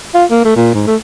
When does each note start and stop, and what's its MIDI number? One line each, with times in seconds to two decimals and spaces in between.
0.15 0.25 65
0.31 0.41 58
0.45 0.56 57
0.56 0.71 46
0.75 0.84 44
0.87 0.96 57